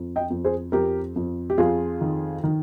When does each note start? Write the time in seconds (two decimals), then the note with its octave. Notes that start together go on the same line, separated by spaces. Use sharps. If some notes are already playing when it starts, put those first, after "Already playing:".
Already playing: F2
0.16 D#5 G5
0.30 F2
0.44 G#4 C5
0.72 F2 G4 A#4
1.16 F2
1.50 G4
1.58 F2 F4 G#4
2.01 D#3
2.44 D#3